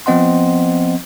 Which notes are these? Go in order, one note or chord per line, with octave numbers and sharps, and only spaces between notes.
F3 B3 C4 D#5 F#5 C6